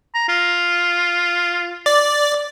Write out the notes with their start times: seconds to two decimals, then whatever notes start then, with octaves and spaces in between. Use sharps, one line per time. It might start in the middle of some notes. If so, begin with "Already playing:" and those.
0.14 A#5
0.28 F4
1.86 D5